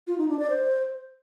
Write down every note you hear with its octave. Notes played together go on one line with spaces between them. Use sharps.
F4
D#4
D4
D5
C5